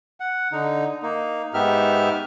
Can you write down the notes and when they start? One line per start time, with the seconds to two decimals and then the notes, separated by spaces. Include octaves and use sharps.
0.20 F#5
0.52 D3 D#4
1.03 A#3 D#4
1.54 G#2 B3 D#4 G4 E5 F6